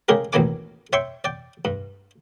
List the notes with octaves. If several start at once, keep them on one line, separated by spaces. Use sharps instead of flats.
C#3 G#3 G4 G#4 A#4
A1 D#2 B2 D#3 G#5 D6
C#5 E5 G5 C6 C#6
D5 G5
G2